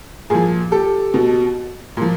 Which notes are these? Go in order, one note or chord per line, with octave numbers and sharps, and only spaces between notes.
A#2 F3 G#4
G4 A4
B2
A#2 F3